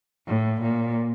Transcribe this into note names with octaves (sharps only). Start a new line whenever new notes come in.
A2
A#2